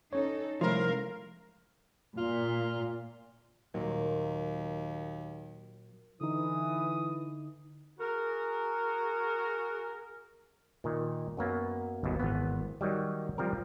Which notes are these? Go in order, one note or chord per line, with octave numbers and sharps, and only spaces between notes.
C#4 D#4 A4 C#5
C2 F3 G#3 A3 A#4 F5
A#2 F4
D#2 A#2 F#3
D3 E3 D#4 D#6
F#4 G#4 A#4
A#2 D#3
F#2 F#3 A#3 B3
G1 D#2 B2
G#1 E3 B3
D#3 F#3 G3
F3 G3 C4 A#4